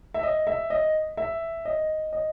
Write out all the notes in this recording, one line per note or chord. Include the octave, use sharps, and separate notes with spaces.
E5
D#5
E5
D#5
E5
D#5
D#5